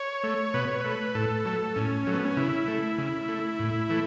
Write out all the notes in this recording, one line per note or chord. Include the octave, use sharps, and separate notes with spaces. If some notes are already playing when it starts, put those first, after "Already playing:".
Already playing: C#5
A3
B2 B4
C#5
A3 B4
A2 A4
F#3 A3
A2 C#4
F#3 A3
B3
C#4
C#3 E4
A3
C#3
A3
A2
E3 A3